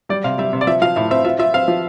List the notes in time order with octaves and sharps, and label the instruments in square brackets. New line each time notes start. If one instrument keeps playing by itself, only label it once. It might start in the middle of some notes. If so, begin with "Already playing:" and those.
[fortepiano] G3 [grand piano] D5
[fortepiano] C3 [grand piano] F5
[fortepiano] G3 [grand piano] E5
[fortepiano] C3
[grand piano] D5
[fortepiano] F3 [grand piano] E5
[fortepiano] F3 [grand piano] F5
[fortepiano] A2 [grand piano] E5
[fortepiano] C4 [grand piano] E5
[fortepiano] F4 [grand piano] E5
[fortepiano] F4 [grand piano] E5
[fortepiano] C4 [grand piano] F5
[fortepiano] F3